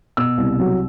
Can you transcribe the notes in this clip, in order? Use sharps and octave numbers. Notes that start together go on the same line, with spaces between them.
B2 E6
C2
F#3